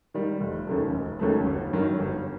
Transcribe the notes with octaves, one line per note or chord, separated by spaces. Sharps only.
D#3 G3
F1
D#2 C#3 F#3 A3
F1
D#2 C#3 F#3 A3
G1
G2 D#3 F#3
G1